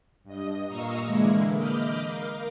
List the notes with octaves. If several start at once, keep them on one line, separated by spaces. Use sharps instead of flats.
G2 D#5
A#2 D#5 F5 A#5 C#6 E6
D3 E3 G#3 A#3 E4
D#5 B5 D6 F6 G6
A#4 F5